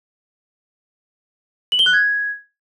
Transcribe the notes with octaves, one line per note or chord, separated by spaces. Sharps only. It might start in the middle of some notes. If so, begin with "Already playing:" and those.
F#7
G7
F#6
G#6